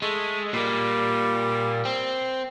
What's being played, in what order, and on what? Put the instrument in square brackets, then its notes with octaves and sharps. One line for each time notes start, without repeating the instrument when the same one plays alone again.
[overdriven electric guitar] G#3 [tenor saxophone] A3
[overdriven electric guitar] A#2 A#3 [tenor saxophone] G3
[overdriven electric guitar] C4